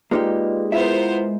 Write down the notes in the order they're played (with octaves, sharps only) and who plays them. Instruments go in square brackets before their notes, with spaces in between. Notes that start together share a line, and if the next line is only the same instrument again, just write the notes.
[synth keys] G#3 [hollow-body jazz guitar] A#3 D#4 G4 [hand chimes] F4 B4 D5
[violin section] B3 A#4 C5 [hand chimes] E4 F4 [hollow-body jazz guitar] E5